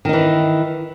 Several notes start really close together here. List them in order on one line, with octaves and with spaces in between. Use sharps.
D#3 D#4 E3